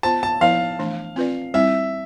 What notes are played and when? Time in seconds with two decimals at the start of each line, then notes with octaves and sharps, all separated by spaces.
0.03 B3 F4 C5 A5
0.23 A5
0.41 F3 B3 E4 B4 D5 F5
0.79 E3 A3 D4
1.16 C4 F4 B4 D5
1.54 G3 C4 E4 E5